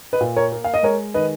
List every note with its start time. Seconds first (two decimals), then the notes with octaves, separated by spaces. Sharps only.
0.13 B4 D#5
0.21 A#2
0.36 A#4 C#5
0.52 A#3
0.64 F5
0.74 D#5
0.83 G#3 A#4 C#5
1.14 D#3 B4 D#5